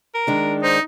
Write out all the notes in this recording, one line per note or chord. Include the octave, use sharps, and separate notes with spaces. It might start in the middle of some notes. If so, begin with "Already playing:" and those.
A#4
D#3 G#3 D4
D#4 C5